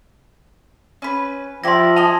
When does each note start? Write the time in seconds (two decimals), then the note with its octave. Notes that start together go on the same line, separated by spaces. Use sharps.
1.02 C#4 B4
1.64 F3 E4 G4 D5 C6 A#6
1.96 D#5 G#5 A5 F7